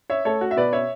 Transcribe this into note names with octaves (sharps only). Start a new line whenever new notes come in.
C#5 E5
A3 A4 C#5
F#4
E5
B2 B4 D5
C#5 E5